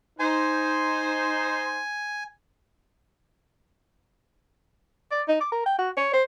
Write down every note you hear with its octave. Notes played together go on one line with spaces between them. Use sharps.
D#4 C5 G#5
D5
D#4
D6
A#4
G5
F#4
C#5
C5